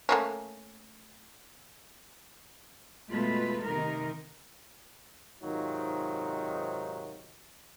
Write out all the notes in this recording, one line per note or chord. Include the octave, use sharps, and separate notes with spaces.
A3 A#3 C#4
B2 G#3 A3 F4 B4
C3 D#3 D#4 A#4
G#2 C3 D#3 F#3 D#4 F4